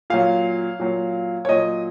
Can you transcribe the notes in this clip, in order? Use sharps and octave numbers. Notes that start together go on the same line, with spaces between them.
A#2 F#3 F5
A#2 F#3
C#5
A#2 F#3 D#5